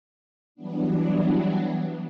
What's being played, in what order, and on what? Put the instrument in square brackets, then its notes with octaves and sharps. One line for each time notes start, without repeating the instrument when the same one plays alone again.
[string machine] E3 F#3 G3 B3 D4